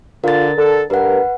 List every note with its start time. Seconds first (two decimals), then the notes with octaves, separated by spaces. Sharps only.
0.24 D3 F4 A#4 A6
0.58 D3 A4
0.90 G2 A#4 B4 F#5